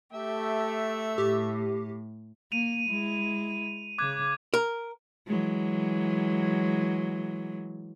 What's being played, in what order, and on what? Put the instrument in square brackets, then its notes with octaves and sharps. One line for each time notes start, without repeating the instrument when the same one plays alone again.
[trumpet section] A3 [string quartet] G4 [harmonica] E5
[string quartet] A2 [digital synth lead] G4
[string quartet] A#3 [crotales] D#7 F7
[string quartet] G#3 E4
[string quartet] C#3 [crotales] D6 F#6 G#6
[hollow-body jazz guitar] A#4
[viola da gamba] E3 F#3 G#3